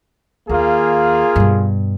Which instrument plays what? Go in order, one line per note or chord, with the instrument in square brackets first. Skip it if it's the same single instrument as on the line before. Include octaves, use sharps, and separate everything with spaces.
[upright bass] D#2 [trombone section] A#3 F4 G#4
[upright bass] G2 B2